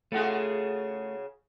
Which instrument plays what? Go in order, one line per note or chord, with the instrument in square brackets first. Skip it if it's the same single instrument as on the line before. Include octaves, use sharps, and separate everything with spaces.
[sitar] C#3 F#4 G#4 [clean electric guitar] A3 F4